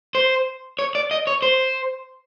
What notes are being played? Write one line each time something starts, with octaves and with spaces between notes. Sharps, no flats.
C5
C#5
D5
D#5
C#5
C5